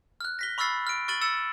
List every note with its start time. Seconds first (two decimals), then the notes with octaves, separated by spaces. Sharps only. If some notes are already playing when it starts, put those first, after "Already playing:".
0.21 F6 F#6
0.39 A#6 B6 G7
0.58 B5 C#6 E6 F6 A6 C7
0.87 F6 D7
1.08 C#6 F6 A6 D#7 F#7
1.21 E6 A6 C#7 E7